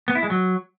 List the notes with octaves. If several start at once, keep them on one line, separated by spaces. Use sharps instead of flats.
B3
E4
G#3
F#3